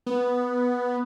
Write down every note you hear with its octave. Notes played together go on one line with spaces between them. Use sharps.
B3